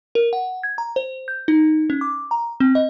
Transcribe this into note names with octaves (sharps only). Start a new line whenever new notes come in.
A#4
F#5
G#6
A#5
C5
G6
D#4
C#4
D6
A#5
C4
D#5